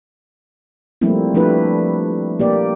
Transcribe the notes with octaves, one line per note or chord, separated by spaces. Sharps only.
F3 G3 A3 A#3 C4 E4
F3 A3 D4 E4 G4 B4
A#3 G4 D5